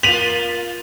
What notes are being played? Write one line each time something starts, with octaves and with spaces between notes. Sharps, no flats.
A#3 F4 B6 D#7 F7 F#7